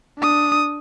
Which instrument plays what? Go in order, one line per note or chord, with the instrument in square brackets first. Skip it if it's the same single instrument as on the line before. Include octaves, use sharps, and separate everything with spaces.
[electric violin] D4 D#6